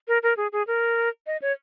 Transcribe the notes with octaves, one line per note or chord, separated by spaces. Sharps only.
A#4
A#4
G#4
G#4
A#4
D#5
C#5